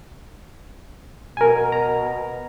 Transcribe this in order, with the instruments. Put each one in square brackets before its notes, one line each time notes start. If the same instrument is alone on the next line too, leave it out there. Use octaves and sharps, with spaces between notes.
[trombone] B2 [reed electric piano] A#4 G#5
[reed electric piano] A#5